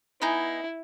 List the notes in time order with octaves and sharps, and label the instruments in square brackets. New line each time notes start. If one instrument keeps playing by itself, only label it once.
[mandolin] B3 D#4 G#4 [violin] E4